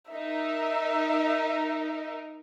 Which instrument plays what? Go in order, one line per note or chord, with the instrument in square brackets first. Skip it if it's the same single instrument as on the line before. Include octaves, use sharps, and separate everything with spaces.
[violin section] D#4 A#4 [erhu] E5